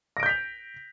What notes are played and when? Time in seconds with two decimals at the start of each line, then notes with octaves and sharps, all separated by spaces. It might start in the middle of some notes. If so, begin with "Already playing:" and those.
0.17 A#6
0.20 D7
0.23 G6
0.26 B6
0.29 F7